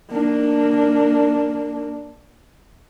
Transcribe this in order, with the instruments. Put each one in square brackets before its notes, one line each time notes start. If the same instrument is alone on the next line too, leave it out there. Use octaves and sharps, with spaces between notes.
[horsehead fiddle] A#3 D4